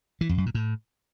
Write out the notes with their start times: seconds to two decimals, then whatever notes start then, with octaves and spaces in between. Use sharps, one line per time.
0.21 E3
0.29 F2
0.38 F#2
0.46 A#2
0.55 A2